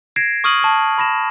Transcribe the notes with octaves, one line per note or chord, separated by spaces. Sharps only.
G#6 A#6 C7 D7 E7
C#6 D#6 F6 D#7 F#7
A5 C#6
B5 A#6 E7